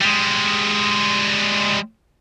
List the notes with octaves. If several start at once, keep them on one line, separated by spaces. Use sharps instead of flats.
G3 G#3